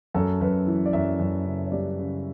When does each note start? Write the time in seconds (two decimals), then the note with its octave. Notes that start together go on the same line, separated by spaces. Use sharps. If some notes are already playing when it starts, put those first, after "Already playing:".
0.15 F#2 A4
0.41 F#2 B4
0.67 E3
0.86 D5
0.93 F#2 E5
1.20 F#2
1.45 C#3
1.64 C#5
1.72 G3 D5
1.98 C#3